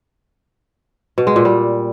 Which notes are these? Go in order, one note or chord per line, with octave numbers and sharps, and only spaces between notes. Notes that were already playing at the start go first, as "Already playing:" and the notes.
B2
G#3
A#2
G3